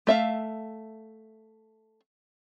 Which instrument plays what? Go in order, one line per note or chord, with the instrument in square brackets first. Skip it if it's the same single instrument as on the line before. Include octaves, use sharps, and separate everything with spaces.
[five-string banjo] A3 E5 F5